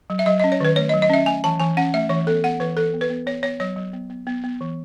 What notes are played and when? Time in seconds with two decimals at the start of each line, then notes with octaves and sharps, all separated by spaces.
0.10 F#3
0.19 E5
0.26 F#3 D#5
0.40 C#4 D#5
0.52 C#5
0.60 D#3 B4
0.76 A3 C#5
0.89 D#5
0.94 F#3
1.02 D#5
1.10 C#4 E5
1.26 A3 G#5
1.44 E3 A5
1.60 E3 G#5
1.77 C#4 F#5
1.94 A3 E5
2.09 E3 C#5
2.27 B3 A4
2.44 B3 F#5
2.60 E3 B4
2.77 E3 A4
2.94 B3
3.01 B4
3.10 B3
3.27 B3 C#5
3.43 B3 C#5
3.60 F#3 C#5
3.77 F#3
3.93 B3
4.10 B3
4.27 B3
4.44 B3
4.61 E3